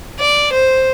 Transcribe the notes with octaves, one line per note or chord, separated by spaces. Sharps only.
D5
C5